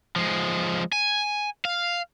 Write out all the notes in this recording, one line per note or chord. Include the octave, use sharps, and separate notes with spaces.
F3 G#3
G#5
F5